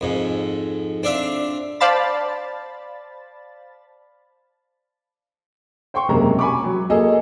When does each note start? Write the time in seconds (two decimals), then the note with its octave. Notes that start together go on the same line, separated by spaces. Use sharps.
0.01 F2 G#2
1.03 C4 D4 E5 F5
1.80 C5 D5 F5 A5 B5 A6
5.94 C5 G5 C6 C#6
6.08 E1 F#2 C3 G#3 A#3 A#5
6.39 G#5 A#5 B5 C#6 D6
6.64 F#3
6.90 A#3 G#4 A4 D#5